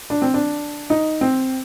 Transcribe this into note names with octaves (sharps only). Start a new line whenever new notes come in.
D4
C4
D4
D#4
C4